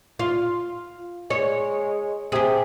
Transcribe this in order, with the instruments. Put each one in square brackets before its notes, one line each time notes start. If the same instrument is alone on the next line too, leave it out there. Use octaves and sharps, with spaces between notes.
[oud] F4
[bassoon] G#3 [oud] C#5
[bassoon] C3 [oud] G4 G#4